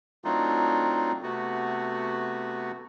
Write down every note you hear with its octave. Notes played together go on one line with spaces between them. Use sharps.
F#3 A3 C4 D4 D#4 F4
C3 A3 B3 F#4